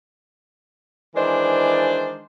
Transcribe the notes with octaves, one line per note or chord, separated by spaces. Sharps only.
D#3 E3 G#3 D4 C5 D5